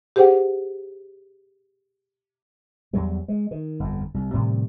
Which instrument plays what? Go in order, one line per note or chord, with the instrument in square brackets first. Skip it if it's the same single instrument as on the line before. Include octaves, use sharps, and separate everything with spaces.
[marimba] G4 G#4 C5 F#5 G5
[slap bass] E2 F#3 G3
G#3
D#3
G1 F2
C2
A2 C3 D#3 G3